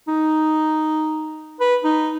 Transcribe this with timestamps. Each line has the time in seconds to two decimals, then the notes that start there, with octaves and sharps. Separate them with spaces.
0.08 D#4
1.60 B4
1.84 D#4